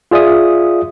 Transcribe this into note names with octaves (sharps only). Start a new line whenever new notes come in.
F4 G#4 D5 E5 D#6